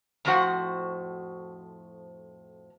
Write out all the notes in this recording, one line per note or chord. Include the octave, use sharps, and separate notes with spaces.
F2 A2 F3 F#4 C5 F#5